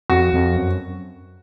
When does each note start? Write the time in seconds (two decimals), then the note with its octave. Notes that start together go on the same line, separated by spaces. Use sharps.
0.10 F2 F#4
0.33 F2
0.57 F#2